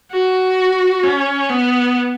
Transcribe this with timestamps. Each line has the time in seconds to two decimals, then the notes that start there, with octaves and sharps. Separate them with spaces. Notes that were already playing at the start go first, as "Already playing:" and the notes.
0.12 F#4
1.04 C#4
1.50 B3